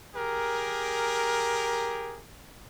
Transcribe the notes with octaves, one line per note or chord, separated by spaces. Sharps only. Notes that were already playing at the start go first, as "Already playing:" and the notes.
G4 G#4 A#4